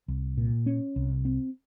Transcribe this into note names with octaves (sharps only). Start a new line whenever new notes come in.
C2
A#2
C#4
C2
C4